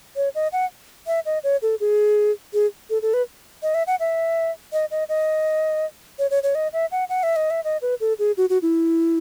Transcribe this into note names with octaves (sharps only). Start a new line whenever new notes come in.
C#5
D#5
F#5
E5
D#5
C#5
A4
G#4
G#4
A4
A4
B4
D#5
E5
F#5
E5
D#5
D#5
D#5
C#5
C#5
C#5
D#5
E5
F#5
F#5
E5
D#5
E5
D#5
B4
A4
G#4
F#4
F#4
E4